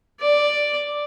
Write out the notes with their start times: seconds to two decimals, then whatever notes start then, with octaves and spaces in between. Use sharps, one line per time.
0.20 D5